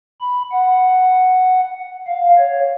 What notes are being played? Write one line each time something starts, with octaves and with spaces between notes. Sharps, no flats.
B5
F#5
F5
C#5